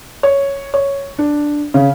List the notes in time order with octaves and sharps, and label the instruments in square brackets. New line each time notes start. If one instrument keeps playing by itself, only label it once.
[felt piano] C#5
C#5
D4
C#3